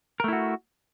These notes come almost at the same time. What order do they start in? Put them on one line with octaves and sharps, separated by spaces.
A#4 A3 E4 F#4